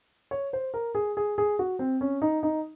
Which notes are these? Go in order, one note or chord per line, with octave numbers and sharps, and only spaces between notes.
C#5
C5
A#4
G#4
G#4
G#4
F#4
C4
C#4
D#4
D#4